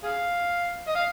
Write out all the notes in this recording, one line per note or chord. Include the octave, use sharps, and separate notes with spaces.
G#4 F5
D#5
F5